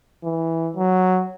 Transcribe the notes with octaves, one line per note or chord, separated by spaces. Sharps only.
E3
F#3